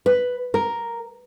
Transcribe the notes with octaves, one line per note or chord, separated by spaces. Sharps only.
B4
A#4